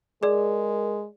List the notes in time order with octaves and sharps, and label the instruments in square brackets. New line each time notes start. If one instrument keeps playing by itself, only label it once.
[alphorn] G#3 [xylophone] G#4 D5 [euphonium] A#4